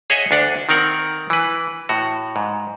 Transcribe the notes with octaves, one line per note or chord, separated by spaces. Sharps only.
G#4 C#5 D#5 E5 F#5 G#5
D2 D4 F#5
D#3 C4 A#4 F#5
E3 B4
A2 F#4
G#2